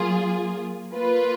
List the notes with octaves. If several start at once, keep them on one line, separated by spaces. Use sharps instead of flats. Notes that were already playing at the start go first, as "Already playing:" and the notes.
Already playing: F#3 A#3 F4 G#4
A#3 F4 B4